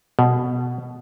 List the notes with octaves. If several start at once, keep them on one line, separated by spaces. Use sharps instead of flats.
B2